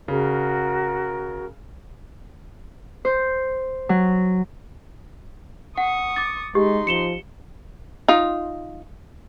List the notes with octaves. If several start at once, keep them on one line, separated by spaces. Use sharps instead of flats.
C#3 F#4 A#4
C5
F#3
F#5 C#6 D#6
D6 A6
G#3 D#4 G4 C6
F3 C#7 E7 G7
D#4 F4